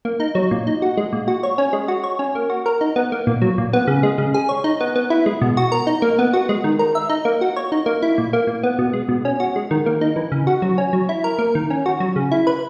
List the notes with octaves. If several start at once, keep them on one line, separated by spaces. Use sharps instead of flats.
A#3
D#4
F#3
A#2
D#4
F#4
G#3
A#2
F#4
C#5
C#4
G#3
F#4
C#5
C#4
A#3
F#4
A#4
D#4
B3
A#3
A#2
F#3
A#2
B3
C#3
G#3
C#3
G#4
C#5
D#4
B3
B3
E4
G#3
B2
F#4
A#4
D#4
A#3
B3
F#4
G#3
D#3
A#4
E5
D#4
A#3
F#4
C#5
D#4
A#3
E4
A#2
A#3
A#2
B3
B2
G#3
B2
C#4
F#4
G#3
D#3
A#3
D#4
E3
C#3
F#4
F#3
C#4
F#3
E4
A#4
A#3
D#3
C#4
F#4
F#3
C#3
E4
B4